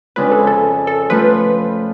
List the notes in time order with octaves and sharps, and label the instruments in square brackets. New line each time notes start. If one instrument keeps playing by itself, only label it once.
[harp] F2 C#3 G#3 D4 F4 [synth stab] B4
[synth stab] A4
A4
A4
[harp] F3 A3 F4 [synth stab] B4